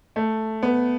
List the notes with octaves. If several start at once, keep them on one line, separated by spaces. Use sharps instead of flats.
A3
B3